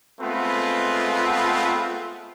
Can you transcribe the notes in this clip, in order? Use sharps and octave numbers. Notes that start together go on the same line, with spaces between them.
G#3 A3 B3 C4 F4 B4